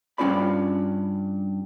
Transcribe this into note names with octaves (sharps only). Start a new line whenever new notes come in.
G2 C#4 F4 D5 B5